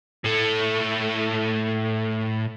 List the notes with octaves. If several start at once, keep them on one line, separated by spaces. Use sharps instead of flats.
A2 A3